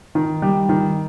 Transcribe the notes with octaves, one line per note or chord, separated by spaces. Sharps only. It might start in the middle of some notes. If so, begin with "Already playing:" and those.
D#3
G3
D#3